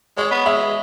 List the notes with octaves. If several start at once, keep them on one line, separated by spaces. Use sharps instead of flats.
G#3 C#5
B3
G#3 E5